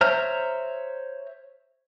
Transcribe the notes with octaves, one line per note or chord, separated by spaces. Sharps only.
C5 C#5 E5 A#5 F6